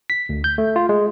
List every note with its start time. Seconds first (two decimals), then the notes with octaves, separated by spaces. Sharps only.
0.10 B6
0.29 D2
0.44 G6
0.58 A3
0.76 F4
0.89 G#3